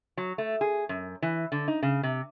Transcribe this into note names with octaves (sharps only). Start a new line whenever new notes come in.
F#3
A3
G#4
F#2
E3
D3
D#4
C#3
C3